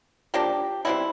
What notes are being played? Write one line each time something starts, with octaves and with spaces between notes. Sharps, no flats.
F3 A#3 D4 G4
B2 G3 C4 E4